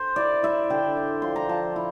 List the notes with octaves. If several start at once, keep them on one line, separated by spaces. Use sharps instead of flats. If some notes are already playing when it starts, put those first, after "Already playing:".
Already playing: C5
E4 D5
E4 E5
D3 G5
E4
F3 C6
A#5
F3 A5
E4